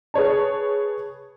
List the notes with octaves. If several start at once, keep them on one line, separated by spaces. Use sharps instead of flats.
G#4 B4 C#5 A5